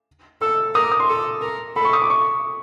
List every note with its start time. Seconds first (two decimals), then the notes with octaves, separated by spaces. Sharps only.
0.41 A4 E6
0.75 A#4 D#6
0.84 D6
0.92 D#6
1.00 C6
1.09 A4
1.42 A#4
1.76 A4 B5
1.85 C#6
1.93 D#6
2.02 D6
2.10 C#6